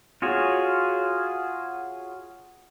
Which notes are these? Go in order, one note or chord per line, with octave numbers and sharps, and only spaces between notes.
F4 F#4 G#4 C#5